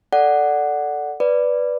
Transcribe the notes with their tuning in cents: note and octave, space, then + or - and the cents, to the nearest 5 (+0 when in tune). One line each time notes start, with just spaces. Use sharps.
A4 +0 D5 +0 F#5 +0
B4 +0 D5 +0